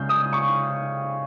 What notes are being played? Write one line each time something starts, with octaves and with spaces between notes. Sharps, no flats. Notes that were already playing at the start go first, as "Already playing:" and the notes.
Already playing: C#3 G#3 G6
D#6
C#6